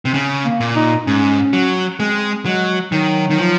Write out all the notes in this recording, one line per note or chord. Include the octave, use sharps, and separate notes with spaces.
C3
C#3
A#3
A#2
D#4
G#2 C#4
F#3
G#3 C4
F#3 G#3
D#3 F#3
D#3
F3